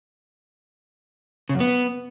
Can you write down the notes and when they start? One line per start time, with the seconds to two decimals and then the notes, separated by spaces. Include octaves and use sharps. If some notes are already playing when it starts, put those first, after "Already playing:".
1.49 C#3
1.55 F#2
1.60 B3